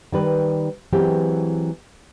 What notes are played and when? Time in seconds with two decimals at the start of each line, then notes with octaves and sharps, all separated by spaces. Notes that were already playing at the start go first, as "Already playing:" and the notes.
0.12 D#3 G3 B4
0.93 E3 F#3 G#3 B3 C4 G4